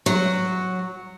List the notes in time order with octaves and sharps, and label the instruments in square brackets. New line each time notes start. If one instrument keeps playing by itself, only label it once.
[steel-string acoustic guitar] F#3